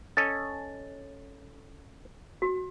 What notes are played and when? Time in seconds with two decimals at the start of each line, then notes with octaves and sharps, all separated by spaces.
0.17 C#4 A4 D#5 A6
2.42 F#4